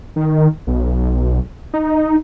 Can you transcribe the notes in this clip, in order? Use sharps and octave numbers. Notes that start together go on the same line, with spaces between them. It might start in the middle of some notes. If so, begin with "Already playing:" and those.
D#3
B1
D#4